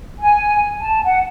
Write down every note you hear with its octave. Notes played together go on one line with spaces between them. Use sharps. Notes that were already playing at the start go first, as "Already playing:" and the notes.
G#5
A5
F#5